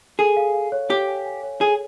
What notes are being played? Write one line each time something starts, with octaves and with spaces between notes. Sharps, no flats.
G#4 A4
F5
F5
C#5
G4 C#5
G#5
G#5
C#5
G#4 A4